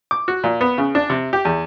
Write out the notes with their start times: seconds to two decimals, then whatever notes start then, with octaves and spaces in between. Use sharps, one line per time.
0.11 D6
0.28 F#4
0.44 A#2
0.61 B3
0.78 C#3
0.95 D4
1.10 C3
1.33 G4
1.45 E2